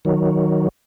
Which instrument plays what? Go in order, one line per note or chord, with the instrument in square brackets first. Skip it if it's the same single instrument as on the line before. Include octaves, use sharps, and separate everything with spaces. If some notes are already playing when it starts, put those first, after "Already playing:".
[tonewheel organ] D#3 F#3